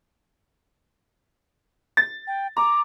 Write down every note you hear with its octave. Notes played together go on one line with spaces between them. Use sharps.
A6
G5
A#5 D6